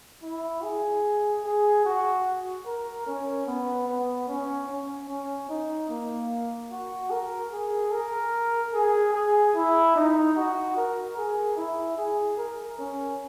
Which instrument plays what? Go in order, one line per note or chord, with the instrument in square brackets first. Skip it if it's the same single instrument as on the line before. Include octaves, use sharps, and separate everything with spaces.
[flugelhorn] E4
G#4
G#4
F#4
A#4
C#4
B3
B3
C#4
C#4
C#4
D#4
A#3
F#4
A#4
G#4
A#4
G#4
G#4
E4
D#4
F#4
A#4
G#4
E4
G#4
A#4
C#4